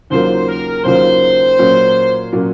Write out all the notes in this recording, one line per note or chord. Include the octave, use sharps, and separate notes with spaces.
D#2 C#3 F#3 A#3 F4 C5
A#4
D#2 C#3 F#3 A#3 F4 C5
A#2 F#3 A#3 C#4
A#2 F#3 A#3 C#4